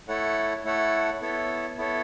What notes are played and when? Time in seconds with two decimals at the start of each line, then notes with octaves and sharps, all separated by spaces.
0.08 A3 E4 A4 C#5 F#5
0.64 A3 E4 A4 C#5 F#5
1.21 B3 E4 A4 C#5
1.77 B3 E4 A4 C#5